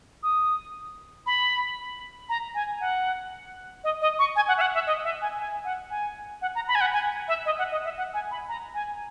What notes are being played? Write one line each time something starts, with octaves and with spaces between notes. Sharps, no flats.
D#6
B5
A#5
G#5
F#5
D#5
D#5
C#6
G#5
F#5
E5
F#5
E5
D#5
E5
G#5
G#5
F#5
G#5
F#5
A#5
B5
G#5
F#5
G#5
E5
D#5
F#5
D#5
E5
F#5
G#5
B5
A#5
G#5